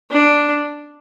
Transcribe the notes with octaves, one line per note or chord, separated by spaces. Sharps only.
D4